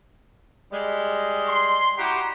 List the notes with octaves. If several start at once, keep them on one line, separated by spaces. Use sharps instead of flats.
G3 G#3
C6
E4 F#4 G4 A#5